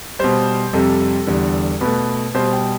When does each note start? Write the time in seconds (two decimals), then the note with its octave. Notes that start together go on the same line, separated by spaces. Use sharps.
0.19 B2 G3 C5
0.73 F2 C3 G3 A4
1.27 E2 D3 G3
1.81 B2 A3 B4
2.34 B2 G3 C5
2.53 G5